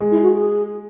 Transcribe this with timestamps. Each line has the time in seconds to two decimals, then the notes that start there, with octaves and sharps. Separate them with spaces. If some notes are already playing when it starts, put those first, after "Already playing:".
0.01 G#3
0.11 E4
0.22 F#4
0.34 G#4